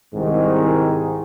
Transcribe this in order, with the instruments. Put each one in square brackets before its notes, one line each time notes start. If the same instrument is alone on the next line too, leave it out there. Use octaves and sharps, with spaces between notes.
[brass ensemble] C2 G#2 D#3